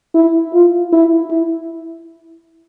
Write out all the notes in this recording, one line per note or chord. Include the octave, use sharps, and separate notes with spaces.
E4
F4
E4
E4